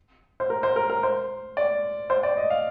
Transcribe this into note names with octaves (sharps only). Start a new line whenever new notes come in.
C5
A#4
C5
A#4
A#4
C5
D5
C5
D5
D#5
F5